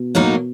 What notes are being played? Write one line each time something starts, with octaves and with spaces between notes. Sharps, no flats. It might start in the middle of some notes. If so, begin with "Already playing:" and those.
Already playing: B2
A2 F#3 A#3 D#4 F#4